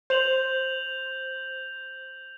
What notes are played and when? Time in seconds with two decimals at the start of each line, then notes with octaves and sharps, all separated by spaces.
0.10 C5 G6 F7 F#7